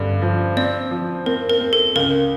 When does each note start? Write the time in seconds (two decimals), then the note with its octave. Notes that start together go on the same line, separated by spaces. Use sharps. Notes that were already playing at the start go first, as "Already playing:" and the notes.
Already playing: G2 D3
0.22 F3
0.57 C4 D5
0.91 F3
1.26 C4 A#4
1.50 A#4
1.61 C4
1.73 A4
1.95 C#2 A#4